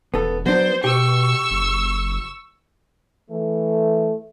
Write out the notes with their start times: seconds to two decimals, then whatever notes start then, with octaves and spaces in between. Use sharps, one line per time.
0.14 E1 B3 A4
0.46 F#3 B3 D4 C5
0.84 B2 G4 C#6 E6
1.51 F#1
3.30 E3 A3